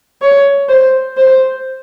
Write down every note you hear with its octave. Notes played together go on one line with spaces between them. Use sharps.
C#5
C5
C5